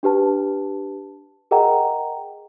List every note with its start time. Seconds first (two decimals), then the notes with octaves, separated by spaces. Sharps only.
0.03 D4 G4 B4 A5
1.51 G#4 A#4 D#5 F#5 G5 A#5